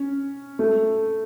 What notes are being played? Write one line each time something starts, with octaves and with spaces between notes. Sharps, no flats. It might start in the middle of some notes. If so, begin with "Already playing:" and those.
Already playing: C#4
A3